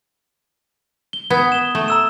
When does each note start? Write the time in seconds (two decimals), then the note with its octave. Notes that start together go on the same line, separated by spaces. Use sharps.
1.13 G7
1.30 B3 D#6 G#6
1.52 E7 G7
1.75 A3
1.88 A#5 E6 E7